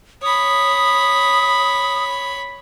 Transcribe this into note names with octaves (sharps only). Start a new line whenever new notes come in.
C#5 B5 D#6